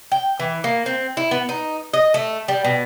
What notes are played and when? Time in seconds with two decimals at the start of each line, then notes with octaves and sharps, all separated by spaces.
0.12 G5
0.40 E3
0.64 A#3
0.86 C4
1.17 E4
1.31 B3
1.49 D#4
1.94 D#5
2.14 A3
2.48 G3
2.64 B2